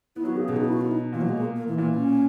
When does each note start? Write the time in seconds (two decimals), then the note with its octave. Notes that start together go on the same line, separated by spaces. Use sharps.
0.16 B3 E4
0.24 F#3 F#4
0.32 D#3
0.37 G#4
0.40 C#3
0.48 B2 G#4
0.56 D#4
0.64 E4
0.73 F#4
0.81 E4
0.91 D#4
1.13 A#2 E3
1.21 F#3
1.29 G#3
1.38 A#3
1.56 A#3
1.67 E3
1.78 A#2 E3
1.94 C#4